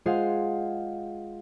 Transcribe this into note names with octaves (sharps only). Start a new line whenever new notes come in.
G#3 F4 G#4 C5 F5 F#5